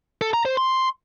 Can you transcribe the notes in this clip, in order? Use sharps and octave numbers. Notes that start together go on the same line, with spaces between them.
A4
A#5
C5
C6